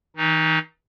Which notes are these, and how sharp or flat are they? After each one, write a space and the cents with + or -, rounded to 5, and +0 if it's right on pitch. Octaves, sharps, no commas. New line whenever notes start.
E3 -45 D#4 -5